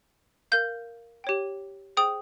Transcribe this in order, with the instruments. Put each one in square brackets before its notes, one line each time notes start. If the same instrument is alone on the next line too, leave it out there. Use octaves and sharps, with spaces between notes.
[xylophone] A#4 F5 G6
G4 C#5 G5
G#4 C5 G5 D#6